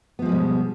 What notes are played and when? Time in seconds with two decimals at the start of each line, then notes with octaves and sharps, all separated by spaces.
0.19 B3
0.22 F3
0.25 G#3
0.29 G3
0.32 B2